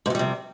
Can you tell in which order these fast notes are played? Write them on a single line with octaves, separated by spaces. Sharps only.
G#2 F2 G3 C3